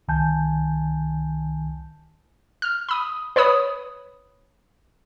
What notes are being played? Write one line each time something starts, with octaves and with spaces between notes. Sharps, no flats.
C2 D#3 G#5 A5 G6
F6
B5 D#6
B4 C#5 B5 D#6